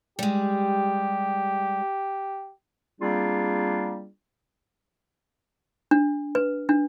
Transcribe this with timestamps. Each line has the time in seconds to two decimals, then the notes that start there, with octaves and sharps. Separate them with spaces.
0.19 G3 G#3 G4
3.01 G3 A#3 C4 D4 F4 G#4
5.91 D4
6.35 B4
6.69 D4